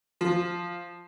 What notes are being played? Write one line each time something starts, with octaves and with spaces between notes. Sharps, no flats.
F3